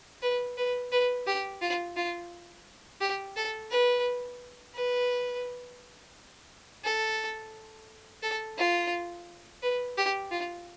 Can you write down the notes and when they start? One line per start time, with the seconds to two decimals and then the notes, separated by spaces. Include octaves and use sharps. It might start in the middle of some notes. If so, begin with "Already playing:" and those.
0.22 B4
0.57 B4
0.92 B4
1.27 G4
1.62 F4
1.96 F4
3.01 G4
3.36 A4
3.70 B4
4.74 B4
6.84 A4
8.22 A4
8.58 F4
9.62 B4
9.97 G4
10.31 F4